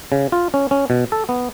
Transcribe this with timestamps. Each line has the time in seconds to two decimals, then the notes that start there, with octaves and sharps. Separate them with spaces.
0.12 C#3
0.32 F4
0.54 C#4
0.71 C#4
0.90 B2
1.12 A4
1.29 B3